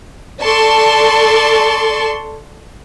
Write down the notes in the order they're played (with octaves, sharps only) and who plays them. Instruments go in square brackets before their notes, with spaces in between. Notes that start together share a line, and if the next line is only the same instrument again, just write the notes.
[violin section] A4 D5 A5 C6 C#6